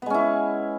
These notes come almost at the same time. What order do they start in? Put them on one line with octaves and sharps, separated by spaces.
B3 G#3 C#4 E4